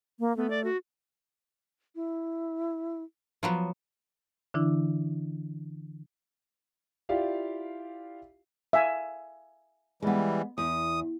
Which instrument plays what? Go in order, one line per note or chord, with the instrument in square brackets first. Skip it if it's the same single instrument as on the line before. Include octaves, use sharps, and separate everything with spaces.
[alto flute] A#3
[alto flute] A3 [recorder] B3
[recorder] D5
F#4
[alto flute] E4
[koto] F3 F#3 B3
[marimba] D3 E3 D4 E4
[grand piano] E4 F4 G4 D5 F5
[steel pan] E5 F5 G#5
[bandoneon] E3 G3 [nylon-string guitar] G#3 B3
[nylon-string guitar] E2 [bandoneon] D#6